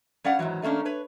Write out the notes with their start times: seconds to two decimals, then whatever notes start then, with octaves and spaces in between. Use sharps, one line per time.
0.24 G3 C#4 D5 F5 F#5
0.39 G#2 D#3 E3 F#3
0.62 D#3 A3 A#3 C#4 D4
0.85 B4 C#5